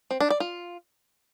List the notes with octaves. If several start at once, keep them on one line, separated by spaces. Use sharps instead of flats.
C4
D4
D5
F4